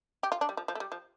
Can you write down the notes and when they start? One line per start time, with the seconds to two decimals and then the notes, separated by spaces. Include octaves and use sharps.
0.23 G4
0.32 F4
0.41 D4
0.49 G3
0.57 F3
0.68 F3
0.75 A3
0.80 G3
0.92 F3